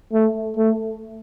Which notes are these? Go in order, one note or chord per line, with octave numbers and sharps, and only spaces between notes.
A3
A3